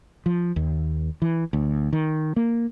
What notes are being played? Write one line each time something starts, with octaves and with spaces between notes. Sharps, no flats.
F3
D#2
E3
D2
D#3
A#3